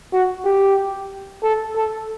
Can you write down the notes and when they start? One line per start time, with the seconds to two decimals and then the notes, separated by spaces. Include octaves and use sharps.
0.13 F#4
0.45 G4
1.43 A4
1.76 A4